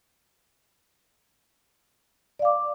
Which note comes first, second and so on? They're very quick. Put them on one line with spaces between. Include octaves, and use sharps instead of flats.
D5 F5 D6